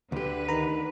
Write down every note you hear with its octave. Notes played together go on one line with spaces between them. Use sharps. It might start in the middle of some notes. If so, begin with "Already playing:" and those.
D2 D3 G4 B4
D#3 A#5 B5